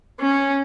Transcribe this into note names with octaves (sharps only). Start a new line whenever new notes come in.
C#4